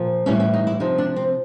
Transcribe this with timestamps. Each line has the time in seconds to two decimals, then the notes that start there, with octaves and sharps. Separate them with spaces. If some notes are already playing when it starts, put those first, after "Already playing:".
Already playing: A#2 F3
0.26 A2 E3 G3 C#4
0.40 C#4
0.54 D#4
0.67 E4
0.80 C3 F3 D#4
0.98 D4
1.16 C4